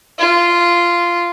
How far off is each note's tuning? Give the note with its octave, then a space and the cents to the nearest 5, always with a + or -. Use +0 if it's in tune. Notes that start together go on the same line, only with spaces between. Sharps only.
F4 -10